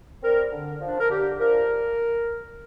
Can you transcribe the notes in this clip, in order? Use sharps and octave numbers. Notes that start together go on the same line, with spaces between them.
G3 C4 A#4
D3
F3 D4
A#4
D3 G4
F3 D4 A#4